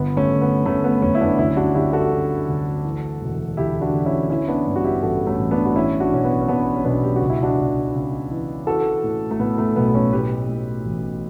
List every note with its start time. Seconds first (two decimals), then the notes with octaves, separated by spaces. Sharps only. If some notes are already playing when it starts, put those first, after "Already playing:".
Already playing: G1 B3
0.17 A3 C#4
0.29 G1
0.42 B3
0.66 G1 A3 C#4
0.84 B3
1.02 F#2 A3 C#4
1.15 E4
1.21 B3 D4
1.38 D2 C#4 E4
1.57 D4 F#4
1.75 D3 E4 G4
1.93 F#4 A4
2.11 D3
2.48 D2
2.84 E3
3.21 E1
3.57 D2 E4 G4
3.81 D4 F#4
3.93 D2
4.06 C#4 E4
4.30 E3 C#4 E4
4.48 B3 D4
4.67 G2
4.76 F#4
4.84 E4 G4
5.02 A1 F#4 A4
5.27 A3 C#4
5.39 A1
5.51 B3 D4
5.66 F#4
5.76 E3 C#4 E4
6.00 D4 F#4
6.12 B1 C#4
6.24 B3
6.42 C#4
6.48 B1 B3 D4
6.76 C#4
6.85 B1 B3 D4
7.03 G4
7.16 F#4
7.21 C#2
7.29 E4
7.43 D4 F#4
7.58 C#2
7.94 C#3
8.31 E3
8.67 E3 F#4 A4
9.04 A2
9.31 A3
9.39 A2 B3
9.58 A3
9.76 B1 B3
9.95 A3 C#4
10.13 A2 G4 B4
10.49 A2
10.85 A1